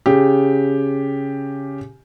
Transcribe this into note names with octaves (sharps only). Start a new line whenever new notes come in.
C#3 G4